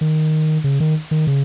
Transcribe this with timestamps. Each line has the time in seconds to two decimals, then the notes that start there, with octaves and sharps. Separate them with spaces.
0.01 D#3
0.64 C#3
0.80 D#3
1.11 D#3
1.27 C#3